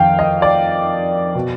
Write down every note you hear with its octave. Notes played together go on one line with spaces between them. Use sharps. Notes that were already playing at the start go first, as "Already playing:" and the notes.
Already playing: F2 D#3 F5 G5
D#5
D5
B2